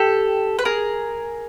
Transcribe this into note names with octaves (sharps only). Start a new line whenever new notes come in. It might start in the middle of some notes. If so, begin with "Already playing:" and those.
Already playing: G4 A4
B4
G#4 A#4